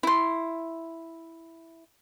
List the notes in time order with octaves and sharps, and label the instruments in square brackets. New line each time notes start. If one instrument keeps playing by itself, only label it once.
[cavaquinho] E4 C6